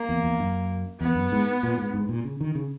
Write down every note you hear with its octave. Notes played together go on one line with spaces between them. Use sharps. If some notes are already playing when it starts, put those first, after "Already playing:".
Already playing: A#3
E2
E2
F#2
E2 B3
F#2
G#2
A#2
G#2
G#2
A#2
C#3
D#3
C#3